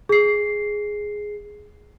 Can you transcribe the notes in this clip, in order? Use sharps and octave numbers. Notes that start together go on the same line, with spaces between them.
G#4 C7